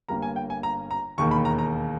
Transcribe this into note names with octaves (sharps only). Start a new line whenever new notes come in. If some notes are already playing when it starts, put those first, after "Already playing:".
G1 G2 G3 A#3 A#5
G#5
G5
G#5
A#5
A#5
E1 D#2 D#3 A#3 C#6
B5
A#5
A#5